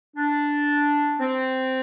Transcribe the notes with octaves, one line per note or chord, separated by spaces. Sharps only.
D4
C4